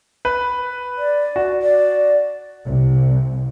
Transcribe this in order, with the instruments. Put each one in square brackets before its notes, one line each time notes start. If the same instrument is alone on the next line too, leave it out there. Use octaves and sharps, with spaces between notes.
[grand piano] B4
[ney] D5
[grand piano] F#4
[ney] D5
[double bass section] C2